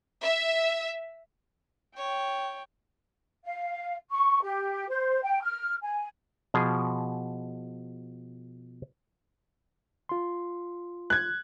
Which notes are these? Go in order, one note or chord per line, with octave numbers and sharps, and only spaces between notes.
E5
C#5 G5
F5
C#6
G4
C5
G5
F6
G#5
B2 F3 G#4
F4 C6
F#6 G#6